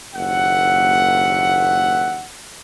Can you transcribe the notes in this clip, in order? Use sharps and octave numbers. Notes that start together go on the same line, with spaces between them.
F#1 D#2 E5 F#5